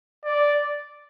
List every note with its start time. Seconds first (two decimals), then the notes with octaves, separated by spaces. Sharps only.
0.24 D5